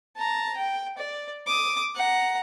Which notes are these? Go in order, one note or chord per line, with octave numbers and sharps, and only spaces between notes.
A5 A#5
G5
D5
D6 D#6
F#5 A#5